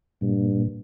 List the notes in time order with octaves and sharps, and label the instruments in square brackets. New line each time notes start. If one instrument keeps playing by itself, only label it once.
[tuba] G2 [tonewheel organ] A#2